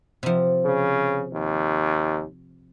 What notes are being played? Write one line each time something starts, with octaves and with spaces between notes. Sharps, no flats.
C3 F3
C#3
D#2